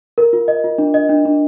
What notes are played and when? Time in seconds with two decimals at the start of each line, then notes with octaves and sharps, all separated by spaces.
0.18 A#4
0.33 F4
0.48 D#5
0.64 F4
0.78 D4
0.94 D#5
1.09 D4
1.25 D4